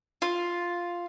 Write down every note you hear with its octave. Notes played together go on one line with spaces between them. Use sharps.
F4